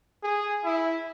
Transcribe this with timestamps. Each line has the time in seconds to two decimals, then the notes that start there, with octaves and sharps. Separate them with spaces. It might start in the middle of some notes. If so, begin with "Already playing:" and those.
0.23 G#4
0.65 E4